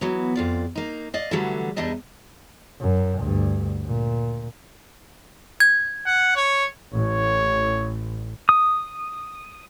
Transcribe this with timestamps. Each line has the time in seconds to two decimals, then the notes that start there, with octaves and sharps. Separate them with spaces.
0.01 E3 F#3 B3
0.35 F2 F4 D5
0.75 A#3 D#4
1.14 D5 D#5 F5
1.31 D3 E3 F#3 G3 A3
1.76 E2 G3 D4 D#4 D#5 E5
2.81 F#2
3.19 D2 G2
3.86 A#2
5.60 G#6
6.06 F#5
6.36 C#5
6.93 A1 C#5
8.49 D#6